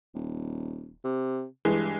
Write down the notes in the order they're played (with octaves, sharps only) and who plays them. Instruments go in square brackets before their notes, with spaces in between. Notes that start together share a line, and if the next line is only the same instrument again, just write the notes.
[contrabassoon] D#1
C3
[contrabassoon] G2 [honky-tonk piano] E3 G#3